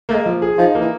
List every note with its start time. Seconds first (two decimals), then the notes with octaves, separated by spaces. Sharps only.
0.09 A3 A#3
0.13 G#3
0.26 F3
0.42 G#4
0.58 F3 D#4
0.75 A#3
0.81 E3